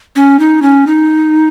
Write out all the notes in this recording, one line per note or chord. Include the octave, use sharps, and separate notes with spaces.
C#4
D#4
C#4
D#4